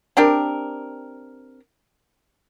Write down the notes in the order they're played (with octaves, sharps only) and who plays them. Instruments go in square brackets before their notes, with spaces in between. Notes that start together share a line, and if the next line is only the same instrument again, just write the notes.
[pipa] C4 D4 G4 A#4